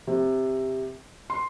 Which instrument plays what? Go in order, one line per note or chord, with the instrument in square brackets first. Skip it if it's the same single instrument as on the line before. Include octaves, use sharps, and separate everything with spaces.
[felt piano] C3
C6